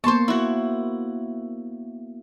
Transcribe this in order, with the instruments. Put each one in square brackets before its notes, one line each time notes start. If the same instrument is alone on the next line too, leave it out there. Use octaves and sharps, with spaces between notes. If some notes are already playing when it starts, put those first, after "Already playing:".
[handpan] A#3 B3 [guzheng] C5 A5 [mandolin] C6 C#6
[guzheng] E4 F#4